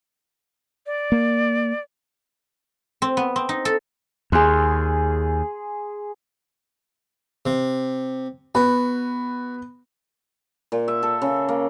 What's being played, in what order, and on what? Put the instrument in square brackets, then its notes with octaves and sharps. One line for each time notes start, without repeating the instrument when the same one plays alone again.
[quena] D5
[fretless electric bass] A#3
[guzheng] C4
B3
C4
D#4
A4
[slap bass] D#2 [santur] G#4 C6
[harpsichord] C3
[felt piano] B3 [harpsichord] F#4
[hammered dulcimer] A#2
E5
A4
C#3
A#3